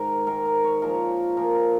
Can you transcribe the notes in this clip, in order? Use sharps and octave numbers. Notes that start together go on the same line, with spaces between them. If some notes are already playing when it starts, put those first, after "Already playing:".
Already playing: G#2 D#3 A#4
G#2 D#3 A#4
A#4
C#5
A#2 F3 A#4
A#2 F3 A#4
A#4